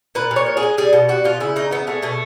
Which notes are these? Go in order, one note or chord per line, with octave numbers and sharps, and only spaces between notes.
A#2 B4
A#2
C#5
F3
G#4
G#3
G3 G#4
B2 F#4
G3 F#4
B2 F4
C#3 E4
C#3 D#4
E3 B3
G#3 A3
B2 A3